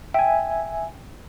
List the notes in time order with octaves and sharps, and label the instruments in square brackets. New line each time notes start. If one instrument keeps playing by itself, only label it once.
[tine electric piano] E5 G#5 [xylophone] G5